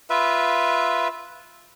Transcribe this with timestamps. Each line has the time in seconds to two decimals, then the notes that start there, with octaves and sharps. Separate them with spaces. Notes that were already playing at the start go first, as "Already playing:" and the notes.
0.10 F4 B4 E5